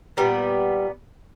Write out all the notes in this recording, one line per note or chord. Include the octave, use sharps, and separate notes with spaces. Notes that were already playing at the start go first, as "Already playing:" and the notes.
A#2 G3 B3